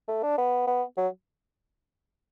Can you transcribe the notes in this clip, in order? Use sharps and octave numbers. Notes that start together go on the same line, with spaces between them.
A3
D4
B3
B3
F#3